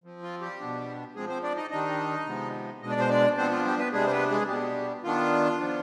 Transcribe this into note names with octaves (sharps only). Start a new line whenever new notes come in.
F3 C4
F4
G3 G4
B2 B3 D4
F3 G#3 C4 G#4
C4 C5
D4 D5
D#4 D#5
D#3 G3 D4 D#4 D#5
C3 F3 G#3 B3
B2 G#3 D4 D#5
D5
C5
D4 D5
F3 B3 C4 D4 C5
F4
G3 G4
B3 B4
C3 G3 G#3 D4 G#4
C5
B3 B4
G#3 G#4
B2 G3 B3 D4 G4
D#3 B3 D4 F4
F3 B3 D4